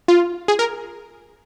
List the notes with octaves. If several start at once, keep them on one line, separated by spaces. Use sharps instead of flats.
F4
G#4
A#4